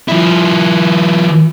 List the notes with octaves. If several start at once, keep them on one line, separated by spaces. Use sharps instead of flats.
F3 E4